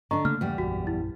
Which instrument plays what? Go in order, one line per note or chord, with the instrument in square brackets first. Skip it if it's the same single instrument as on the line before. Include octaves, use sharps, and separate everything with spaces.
[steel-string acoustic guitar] D3 D4 [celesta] D#5 A#5 C#6
[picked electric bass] C#3 A3 A#3 [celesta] F6
[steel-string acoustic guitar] E2 G3
[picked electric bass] A#1 F#2 [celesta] F#4
[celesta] E4